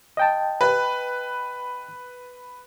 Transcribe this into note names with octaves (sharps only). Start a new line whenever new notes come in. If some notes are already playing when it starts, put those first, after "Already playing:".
D#5 G5 A5
B4